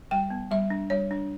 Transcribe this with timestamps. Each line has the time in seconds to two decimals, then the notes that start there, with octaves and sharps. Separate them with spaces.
0.11 G3 G5
0.30 B3
0.51 G3 E5
0.70 D4
0.90 G3 C#5
1.11 D4